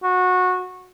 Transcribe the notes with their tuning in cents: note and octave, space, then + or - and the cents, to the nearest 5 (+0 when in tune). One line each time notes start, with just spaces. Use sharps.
F#4 -20